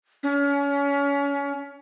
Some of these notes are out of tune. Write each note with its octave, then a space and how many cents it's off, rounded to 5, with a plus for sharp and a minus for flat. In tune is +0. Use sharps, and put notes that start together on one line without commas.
C#4 +30